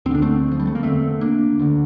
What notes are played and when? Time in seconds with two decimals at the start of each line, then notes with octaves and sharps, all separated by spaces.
0.06 D2 C4
0.11 D3 D4
0.22 A3 C4
0.51 F3
0.60 G3
0.67 A3
0.75 A#3
0.83 E2 D3 A3 C4
1.21 A#3 D4
1.59 D2 D3